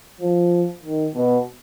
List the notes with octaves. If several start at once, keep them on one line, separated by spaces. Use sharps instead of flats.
F3
D#3
B2